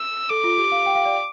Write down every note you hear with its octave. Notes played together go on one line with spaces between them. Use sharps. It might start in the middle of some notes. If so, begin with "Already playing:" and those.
Already playing: E6
A4 D6
F4
G4
F5
G5
F5
D5